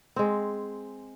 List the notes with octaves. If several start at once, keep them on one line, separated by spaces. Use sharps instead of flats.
G#3 C4